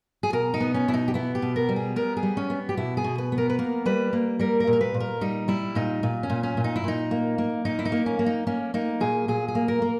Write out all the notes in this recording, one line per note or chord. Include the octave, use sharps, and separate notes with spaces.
G#4
B2 A#4
D#4
B3
C#4
B2 E4
D#4
G4
B3 E4
G4
B2
A#4
G3
G#4
B3 A#4
G#4
G3
C#4
B3
G4
B2 E4
G#4
B2
B4
B3
A#4
B4
A#3 A#4
G3 B4
A#3
G3 A#4
A#4
A#2
A#4
B4
A#2
A#4
G3 D#4
G3 E4
A#2 D#4
A#2
C#4
A#2
C#4
A#2
D#4
E4
A#2 D#4
A#3
A#3
A#2 D#4
E4
D#4
A#3
C#4
A#3
D#4
A#3 C#4
A#3 D#4
A#2 G#4
A#2 G#4
G#4
A#3
A#4
A#3